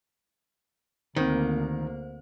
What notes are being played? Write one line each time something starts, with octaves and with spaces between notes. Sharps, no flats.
D2 D#3 A#3 C4 C5